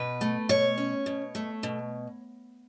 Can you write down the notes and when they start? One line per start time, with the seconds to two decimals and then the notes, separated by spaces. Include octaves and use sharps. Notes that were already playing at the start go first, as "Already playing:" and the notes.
Already playing: B2 B4
0.21 A3
0.49 B2 C#5
0.78 C#4
1.06 B2
1.35 A3
1.63 B2